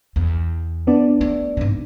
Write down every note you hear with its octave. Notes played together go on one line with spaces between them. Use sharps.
E2
B3 D4 D5
A3
G#2 C3